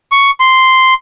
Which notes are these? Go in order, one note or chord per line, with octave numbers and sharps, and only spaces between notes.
C#6
C6